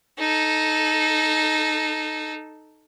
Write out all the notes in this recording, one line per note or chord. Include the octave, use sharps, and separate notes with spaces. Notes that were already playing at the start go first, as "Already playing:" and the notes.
D#4 A4